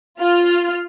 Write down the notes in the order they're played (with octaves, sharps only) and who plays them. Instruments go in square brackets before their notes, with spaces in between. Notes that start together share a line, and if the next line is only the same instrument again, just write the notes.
[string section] F4 F6